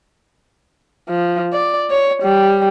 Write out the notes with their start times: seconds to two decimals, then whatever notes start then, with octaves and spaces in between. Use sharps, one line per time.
1.09 F3
1.52 D5
1.91 C#5
2.23 G3